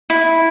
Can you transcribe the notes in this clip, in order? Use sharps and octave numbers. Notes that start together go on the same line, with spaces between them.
E4